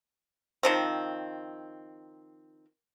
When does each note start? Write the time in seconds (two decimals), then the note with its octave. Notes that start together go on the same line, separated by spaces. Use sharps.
0.63 D#3 F3 C4